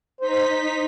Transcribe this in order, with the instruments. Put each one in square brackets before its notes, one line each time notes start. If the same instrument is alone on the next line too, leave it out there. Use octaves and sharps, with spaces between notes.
[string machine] D#4 B6 [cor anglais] C5